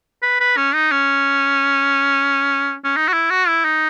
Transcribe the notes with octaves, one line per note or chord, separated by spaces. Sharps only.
B4
B4
C#4
D#4
C#4
C#4
D#4
F#4
E4
F#4
E4
D#4